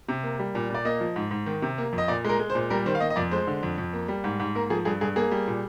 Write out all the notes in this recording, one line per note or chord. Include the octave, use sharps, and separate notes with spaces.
C3
A#3
G3
A#2
A#2 D5
A#3 D#5
F3
G#2
G#2
D#3
C3
A#3
F2
D#5
A#2 D5
G#3 A#4
G#3
C5
A#2
G3 A#4
D#3 C5
F5
A#3 D#5
D#5
F2 D5
G#3 C5
D3
F2
F2
A#3
G3
G#2
G#2
A#3 A#4
F3 G#4
G2 G#4
G2 G#4
A#3 G#4
G3
A#2